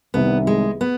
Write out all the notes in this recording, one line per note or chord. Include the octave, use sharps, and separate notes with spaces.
C2 C3 D#3 G3 B3
G#3
B3